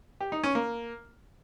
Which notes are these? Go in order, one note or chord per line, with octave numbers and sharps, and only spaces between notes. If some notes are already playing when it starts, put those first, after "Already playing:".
G4
D#4
C#4
A#3